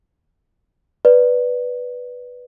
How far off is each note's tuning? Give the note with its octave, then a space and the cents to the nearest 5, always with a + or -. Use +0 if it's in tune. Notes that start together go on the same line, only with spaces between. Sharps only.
B4 +0 D5 +0